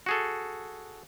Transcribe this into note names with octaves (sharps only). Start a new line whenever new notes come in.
F#4 G#4 A4